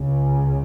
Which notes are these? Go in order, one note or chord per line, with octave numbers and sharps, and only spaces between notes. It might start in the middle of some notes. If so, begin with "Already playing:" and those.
Already playing: C#2 C#3